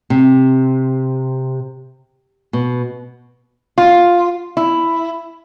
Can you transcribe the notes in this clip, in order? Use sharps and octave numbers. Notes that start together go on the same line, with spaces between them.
C3
B2
F4
E4